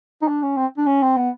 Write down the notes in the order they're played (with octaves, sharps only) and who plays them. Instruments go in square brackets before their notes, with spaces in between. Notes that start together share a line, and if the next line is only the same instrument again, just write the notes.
[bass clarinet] D#4
D4
C#4
C4
D4
C#4
C4
B3